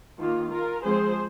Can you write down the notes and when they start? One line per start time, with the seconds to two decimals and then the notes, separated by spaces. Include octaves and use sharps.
0.19 D#3 A#3 F4
0.51 F4 A#4
0.84 F3 G#3 C4 G#4 C5